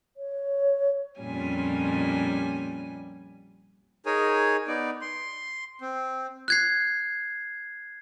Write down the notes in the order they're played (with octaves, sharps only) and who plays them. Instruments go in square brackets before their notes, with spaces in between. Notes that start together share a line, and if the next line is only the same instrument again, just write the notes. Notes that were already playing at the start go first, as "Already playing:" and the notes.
[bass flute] C#5
[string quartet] F2 A#2 G3 C#4 G#5
[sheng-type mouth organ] D#4 G#4 A#4 C#5 G#5
B3 D#4 D5
C6
C4
[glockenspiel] F#6 G#6 C7